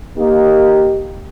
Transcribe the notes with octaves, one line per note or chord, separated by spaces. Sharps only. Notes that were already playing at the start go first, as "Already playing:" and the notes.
A#3 D#4 G4